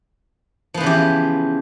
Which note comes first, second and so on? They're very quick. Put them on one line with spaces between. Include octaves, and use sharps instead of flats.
F3 B3 E3 C#3 G4